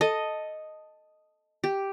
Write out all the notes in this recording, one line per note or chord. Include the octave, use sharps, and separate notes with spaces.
A4 D#5
G4